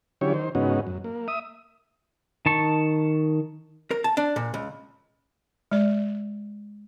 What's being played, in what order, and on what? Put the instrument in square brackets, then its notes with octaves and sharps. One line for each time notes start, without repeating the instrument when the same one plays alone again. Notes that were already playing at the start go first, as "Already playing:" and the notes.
[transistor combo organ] D3 F#3 C#4 E4 G4 C#5
D#3 C5
G#2 C#3 B3 C#4 D#4 F#4
F#2
A#3
E5 D#6
[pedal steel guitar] D#3 A5 C#6
[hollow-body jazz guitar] A#4
A5
D4
A#2
C#2
[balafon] G#3 D5